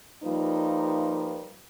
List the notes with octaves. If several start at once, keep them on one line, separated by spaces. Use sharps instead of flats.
F3 G3 A#3 D#4 F4 B4